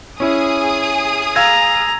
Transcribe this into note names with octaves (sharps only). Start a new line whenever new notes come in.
C#4 E4 G#4 D#6
F5 A#5 E6 G#6